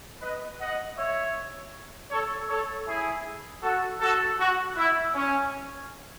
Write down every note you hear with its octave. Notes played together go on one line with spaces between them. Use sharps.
B4 D#5
D#5 F#5
C#5 E5
A4 C#5
A4 C#5
E4 G#4
F#4 A4
F#4 A4
F#4
E4
C#4